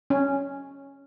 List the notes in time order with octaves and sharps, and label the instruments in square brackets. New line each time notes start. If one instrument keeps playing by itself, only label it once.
[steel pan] C#4